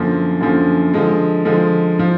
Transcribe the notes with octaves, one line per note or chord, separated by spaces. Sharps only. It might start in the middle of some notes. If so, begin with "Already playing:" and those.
Already playing: F#2 D3 F3 A#3
F#2 D3 F3 A#3
D3 F3 G#3
D3 F3 G#3
F3